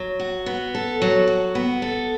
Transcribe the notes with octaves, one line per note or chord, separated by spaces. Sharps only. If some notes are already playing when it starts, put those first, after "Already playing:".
Already playing: F#3
F#4
B3
A4
F#3
F#4
B3
A4